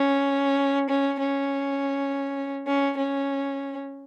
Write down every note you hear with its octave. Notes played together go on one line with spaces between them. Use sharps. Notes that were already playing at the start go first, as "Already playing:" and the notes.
Already playing: C#4
C#4
C#4
C#4
C#4